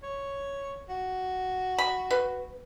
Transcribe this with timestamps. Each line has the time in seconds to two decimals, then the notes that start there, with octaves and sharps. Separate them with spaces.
0.03 C#5
0.89 F#4
1.78 B5
2.11 B4